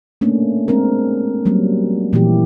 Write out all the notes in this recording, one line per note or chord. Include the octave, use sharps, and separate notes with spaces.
A3 A#3 C#4 D4
G#3 C4 D4 A#4
F#3 G3 A#3 C#4
A#2 E3 F3 A#3 E4 G4